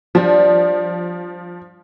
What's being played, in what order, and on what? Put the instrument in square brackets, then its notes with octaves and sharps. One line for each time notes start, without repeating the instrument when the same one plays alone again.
[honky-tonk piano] F3 [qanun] G3 D4